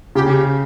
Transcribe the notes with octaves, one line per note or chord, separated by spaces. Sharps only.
C#3 G4